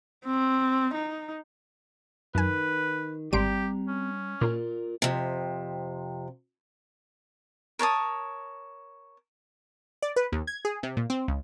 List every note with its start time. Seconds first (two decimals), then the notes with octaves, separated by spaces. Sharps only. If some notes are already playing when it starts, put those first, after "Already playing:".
0.25 C4
0.94 D#4
2.35 F#2 D#3 B4 G#5
3.33 G#1 G3 C4 G4 A#5 C6 D7
3.88 C#4
4.41 A#2 A#3 F4 A#4 D5
5.02 F2 C3
7.79 A#4 C#5 A5 D#6
10.02 D5
10.16 B4
10.32 D#2
10.47 G#6
10.65 G#4
10.83 C3
10.97 A#2
11.10 C4
11.28 C#2